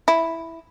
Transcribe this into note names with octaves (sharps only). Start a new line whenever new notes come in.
E4